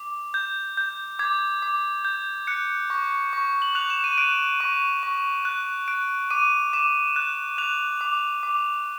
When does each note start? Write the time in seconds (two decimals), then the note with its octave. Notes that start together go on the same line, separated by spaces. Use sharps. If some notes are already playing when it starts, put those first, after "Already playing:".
Already playing: D6
0.34 G6
0.77 G6
1.19 D6 G#6
1.62 D6
2.05 G6
2.47 F#6 C#7
2.90 C#6
3.33 C#6
3.62 F#7
3.75 F#6 F7
3.90 E7
4.04 D#7
4.18 F#6 D7
4.60 C#6
5.03 C#6
5.45 F#6
5.88 F#6 D7
6.30 D6 D#7
6.73 D6 E7
7.16 F#6
7.58 F#6 F7
8.01 D6
8.43 D6